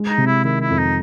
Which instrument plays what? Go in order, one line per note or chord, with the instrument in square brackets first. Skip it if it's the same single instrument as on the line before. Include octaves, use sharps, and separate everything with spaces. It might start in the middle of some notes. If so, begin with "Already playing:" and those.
Already playing: [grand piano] G#3
[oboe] D#4
[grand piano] C3
[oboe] E4
[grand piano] D#3 [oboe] E4
[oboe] E4
[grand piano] F2
[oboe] D#4